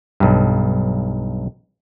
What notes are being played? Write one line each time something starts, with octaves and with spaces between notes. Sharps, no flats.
B1 G2